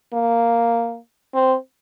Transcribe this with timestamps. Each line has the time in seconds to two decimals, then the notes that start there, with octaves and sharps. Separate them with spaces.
0.13 A#3
1.34 C4